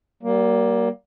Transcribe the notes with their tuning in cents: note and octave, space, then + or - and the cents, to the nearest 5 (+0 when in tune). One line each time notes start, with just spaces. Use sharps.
G3 -35 A#3 +15